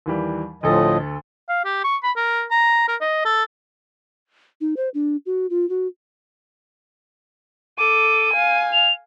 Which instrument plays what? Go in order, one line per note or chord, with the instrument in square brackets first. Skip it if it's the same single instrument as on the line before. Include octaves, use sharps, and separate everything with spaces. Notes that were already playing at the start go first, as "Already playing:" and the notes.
[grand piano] D#2 E3 G3
[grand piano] D2 A4 [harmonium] A2 F3 D#5
[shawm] F5
G4
C#6
B5
A#4
A#5
A#4
D#5
A4
[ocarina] D#4
C5
D4
F#4
F4
F#4
[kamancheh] A4 D6 [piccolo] D#7
[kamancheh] F5 G#5
[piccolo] F7